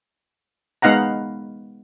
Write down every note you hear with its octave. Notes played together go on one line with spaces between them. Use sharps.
G#3 B3 D#4 F5 F#5 A#5